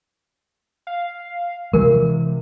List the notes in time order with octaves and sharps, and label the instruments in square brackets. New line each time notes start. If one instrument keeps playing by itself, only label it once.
[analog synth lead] F5
[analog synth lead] C3 [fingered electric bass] E3 G#3 [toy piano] A#4